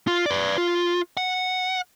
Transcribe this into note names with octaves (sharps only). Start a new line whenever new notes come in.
F4
B4 D5
F4
F#5